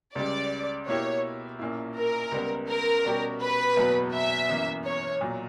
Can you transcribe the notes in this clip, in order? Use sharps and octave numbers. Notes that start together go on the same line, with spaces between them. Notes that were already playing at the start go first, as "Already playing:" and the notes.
C#2 C#3 G3 D5
B2 A#3 E4 G4 C#5
A#1 A#2 A#3 C#4 E4
A#4
C#2 C#3 G3 B3
A#4
B2 G3 C#4 G4
B4
F#1 E2 B2 F#3 B3
E5
G1 F#2 E3 A#3
C#5
B1 A#2 F#3